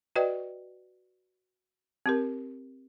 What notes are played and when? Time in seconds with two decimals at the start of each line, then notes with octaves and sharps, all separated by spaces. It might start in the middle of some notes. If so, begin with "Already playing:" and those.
0.16 F#4 B4 D5 D#5 G5
2.06 C4 G4 A#4